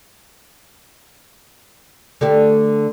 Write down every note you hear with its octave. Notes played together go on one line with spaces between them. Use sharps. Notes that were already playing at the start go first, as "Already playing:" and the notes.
D3 A3 G4